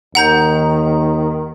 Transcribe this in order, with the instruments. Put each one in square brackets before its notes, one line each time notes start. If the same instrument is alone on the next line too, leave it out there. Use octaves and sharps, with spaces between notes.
[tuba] D#2 [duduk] D#3 [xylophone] F#5 A#5 G6